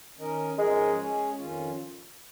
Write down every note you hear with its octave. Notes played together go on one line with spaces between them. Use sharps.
D#3 C#4 A#4 D#5
G#2 F3 G#3 C#4 A#4 D#5
G#3 C#4 G#4 C#5
F2 D#3 C#4 F4